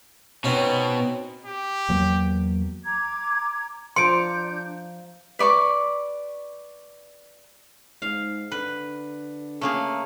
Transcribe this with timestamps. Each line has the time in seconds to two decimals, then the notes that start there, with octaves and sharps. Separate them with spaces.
0.44 B2 C4 C#4 D#4
1.45 G4
1.89 E2 F#3 A#3
2.84 A#5 D6 G#6
3.96 F3 D4 F5 A#5 C6 G6 C#7 D7
5.39 B4 D5 C#6 D6
8.02 G#2 F5
8.51 D3 B4
9.61 C#3 A3 A#3 G#4